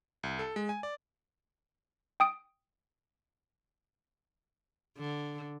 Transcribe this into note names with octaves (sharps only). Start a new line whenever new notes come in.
C2
A4
G#3
G#5
D5
G5 D#6 D7
D3